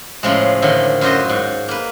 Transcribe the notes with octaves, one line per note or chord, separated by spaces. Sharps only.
A2 C#3 F3 G#3
A2 D3 D#3 F3
F#2 F4 F#4 C5 D#5
G#2
A#3 B4